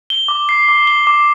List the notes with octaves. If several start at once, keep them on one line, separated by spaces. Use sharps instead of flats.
G7
D6
C7
D6
G7
D6